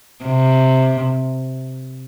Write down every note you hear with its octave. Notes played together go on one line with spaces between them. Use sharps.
C3